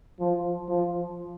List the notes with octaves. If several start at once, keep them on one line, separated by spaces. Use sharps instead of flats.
F3
F3